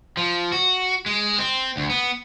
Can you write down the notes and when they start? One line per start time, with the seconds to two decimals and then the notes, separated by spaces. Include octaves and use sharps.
0.17 F3
0.52 F#4
1.06 G#3
1.38 C4
1.77 D2
1.90 B3